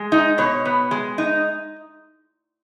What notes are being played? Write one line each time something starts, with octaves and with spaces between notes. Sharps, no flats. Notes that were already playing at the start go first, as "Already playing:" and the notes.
Already playing: G#3
D#4
B2 C#5
B3
G#3
D#4